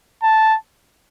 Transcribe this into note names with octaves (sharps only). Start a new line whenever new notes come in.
A5